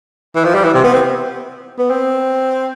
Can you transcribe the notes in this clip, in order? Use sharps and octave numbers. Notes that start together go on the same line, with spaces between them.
E3
F3
G3
E3
C3
B3
C4
B3
C4